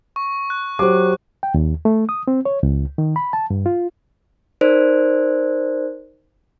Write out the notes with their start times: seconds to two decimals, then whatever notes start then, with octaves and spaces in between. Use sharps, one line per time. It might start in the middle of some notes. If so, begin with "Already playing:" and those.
0.16 C#6
0.50 F#6
0.79 F#3 G4 C5 D6
1.43 G5
1.54 D#2
1.85 A3
2.09 D#6
2.28 C4
2.45 C#5
2.63 C#2
2.98 D#3
3.16 B5
3.33 A5
3.50 G2
3.66 F4
4.61 D#4 A#4 C5 D5